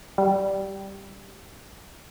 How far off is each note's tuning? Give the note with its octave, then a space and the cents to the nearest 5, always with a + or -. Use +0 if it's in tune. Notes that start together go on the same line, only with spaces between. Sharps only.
G3 -5